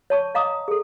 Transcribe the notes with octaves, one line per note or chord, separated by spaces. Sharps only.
C#5 A5 C#6
D#5 F5 A#5 D6 D#6
G#4 A4